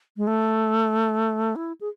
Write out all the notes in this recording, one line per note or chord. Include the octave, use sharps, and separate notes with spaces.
G#3
A3
E4
G#4